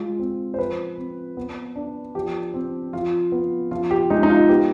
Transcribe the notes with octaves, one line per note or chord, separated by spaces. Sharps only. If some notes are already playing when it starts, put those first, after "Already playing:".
Already playing: G#3 F4
C4
C5
F3 B4
C4
B3
D4
F3 G4
C4
F3 F4
B3
F3 F4
G4
G#3 D#4
D#4
F4
B3 G4